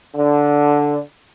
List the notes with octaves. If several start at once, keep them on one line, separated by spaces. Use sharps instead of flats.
D3